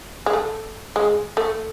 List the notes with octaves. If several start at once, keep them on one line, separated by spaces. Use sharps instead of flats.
G#3
A3
G#3
A3